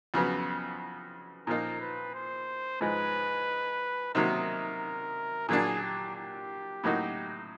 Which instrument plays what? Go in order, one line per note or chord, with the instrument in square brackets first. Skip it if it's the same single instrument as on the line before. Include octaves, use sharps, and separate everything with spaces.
[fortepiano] F2 C#3 F#3 B3
[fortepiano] A#2 F3 A#3 D#4 [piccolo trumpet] A#4
[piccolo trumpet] B4
C5
[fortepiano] G#2 F3 G#3 [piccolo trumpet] B4
[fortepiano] C3 D#3 F#3 A#3 [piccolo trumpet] A#4
[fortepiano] A#2 F#3 A#3 D4 [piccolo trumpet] G#4
[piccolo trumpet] G4
G4
[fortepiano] A2 F#3 A#3 D#4 F#4